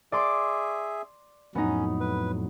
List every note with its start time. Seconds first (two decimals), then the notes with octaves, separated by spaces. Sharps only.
0.12 G#4 D5 E5 C6 D6
1.55 F2 A2 F#3 B3 C#4 D#4
2.00 B4